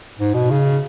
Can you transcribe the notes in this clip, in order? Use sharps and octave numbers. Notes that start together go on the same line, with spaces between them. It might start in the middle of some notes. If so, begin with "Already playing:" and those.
G#2
B2
C#3